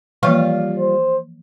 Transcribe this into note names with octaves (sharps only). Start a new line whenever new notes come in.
E3 F3 G3 A#3 F4 F5
C5